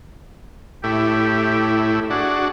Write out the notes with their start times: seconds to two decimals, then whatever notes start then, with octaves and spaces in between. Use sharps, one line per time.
0.84 A2 E4 G4
2.10 D4 F#4 G#4